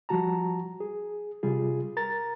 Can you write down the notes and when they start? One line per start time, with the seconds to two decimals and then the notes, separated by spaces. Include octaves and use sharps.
0.09 F3 G3 F#4 A5 A#5
0.80 G#4
1.43 C3 G3 F4 G#4
1.97 A#4 A#5 A6